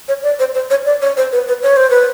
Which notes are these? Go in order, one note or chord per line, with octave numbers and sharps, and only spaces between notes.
C#5
D5
C5
C5
C#5
D5
C#5
C5
B4
B4
C#5
C5
B4